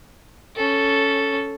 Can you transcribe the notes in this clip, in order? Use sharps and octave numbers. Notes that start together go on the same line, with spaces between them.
C#4 A4